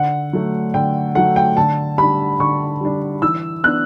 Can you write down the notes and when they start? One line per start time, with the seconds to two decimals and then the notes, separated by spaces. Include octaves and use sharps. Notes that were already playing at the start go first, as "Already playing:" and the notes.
Already playing: D3 F#5
0.33 F#3 A3
0.74 D3 G5
1.15 F#3 A3 F#5
1.36 G5
1.57 D3 A5
1.98 G3 D4 B5
2.39 D3 C#6
2.81 G3 D4
3.22 E3 E6
3.64 B3 D4 F#6